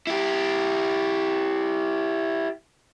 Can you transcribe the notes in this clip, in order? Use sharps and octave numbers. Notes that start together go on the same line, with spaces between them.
E4 G4